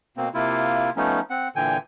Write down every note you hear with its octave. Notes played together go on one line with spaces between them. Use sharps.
B2 A#3 C4
C3 A#3 E4 F4
F3 A3 B3 C#4 D#4
C4 F#5
A#2 D3 E3 G5 G#5